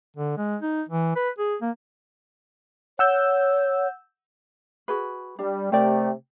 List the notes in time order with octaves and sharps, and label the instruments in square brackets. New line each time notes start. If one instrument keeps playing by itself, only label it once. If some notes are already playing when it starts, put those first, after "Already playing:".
[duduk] D3
G#3
D#4
E3
B4
G#4
A#3
[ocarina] C#5 [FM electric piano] F#5 E6 G6
[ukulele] F#4 G#4 B4
[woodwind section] G3 [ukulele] D4
[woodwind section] C3 A3 [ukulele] G4 A#4 D5